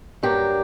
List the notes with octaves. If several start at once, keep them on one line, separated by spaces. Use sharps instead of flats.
G2 F#3 A#3 D4 G4